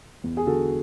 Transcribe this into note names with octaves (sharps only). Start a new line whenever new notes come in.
E2
G#4
D3 F#4 A4